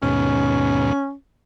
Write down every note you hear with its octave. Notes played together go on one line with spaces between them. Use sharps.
D#2 G#2 B2 C#4